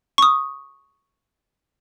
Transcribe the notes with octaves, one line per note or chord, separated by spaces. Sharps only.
C#6 D#6